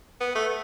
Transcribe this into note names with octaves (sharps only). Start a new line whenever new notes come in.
B3
A3